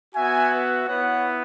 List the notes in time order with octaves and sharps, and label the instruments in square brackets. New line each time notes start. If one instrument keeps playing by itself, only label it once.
[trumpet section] B3 F#4 E5 G#5
B4 E5
B3 E4 C#5 F#5